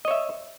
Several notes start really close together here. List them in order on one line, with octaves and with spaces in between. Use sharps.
D#5 C#5 E5